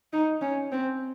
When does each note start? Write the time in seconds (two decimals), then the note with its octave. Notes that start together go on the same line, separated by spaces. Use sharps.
0.13 D#4
0.41 C#4
0.72 C4